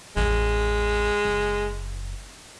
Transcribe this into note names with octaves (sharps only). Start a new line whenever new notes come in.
A1 E2 G#3
F#1